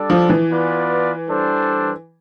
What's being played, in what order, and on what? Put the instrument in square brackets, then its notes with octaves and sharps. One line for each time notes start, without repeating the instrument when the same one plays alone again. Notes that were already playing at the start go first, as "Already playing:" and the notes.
Already playing: [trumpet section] G3 D4 A4 D5
[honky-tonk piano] F3
E3
[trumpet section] B3 F4 B4 D5
G3 D4 A4 C5